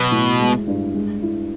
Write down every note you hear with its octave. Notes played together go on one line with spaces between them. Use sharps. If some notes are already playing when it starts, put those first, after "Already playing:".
Already playing: B2 F#3
A2
G#3
G2
G#3
E4